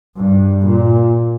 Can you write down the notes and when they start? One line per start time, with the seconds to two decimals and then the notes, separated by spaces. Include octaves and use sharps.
0.17 G2
0.66 A#2